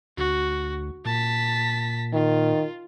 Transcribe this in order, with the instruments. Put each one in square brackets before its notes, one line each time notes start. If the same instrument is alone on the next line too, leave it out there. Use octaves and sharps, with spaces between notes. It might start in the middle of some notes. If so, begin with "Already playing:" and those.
[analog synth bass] D2 [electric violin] F#4
[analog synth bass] A#2 [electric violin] A5 B6
[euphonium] D#3 [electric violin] F4